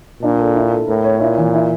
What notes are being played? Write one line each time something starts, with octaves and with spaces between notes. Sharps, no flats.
A#2 D4
A4
E4
A4
A2 A#4
C#5
A#2 E4
E3
E4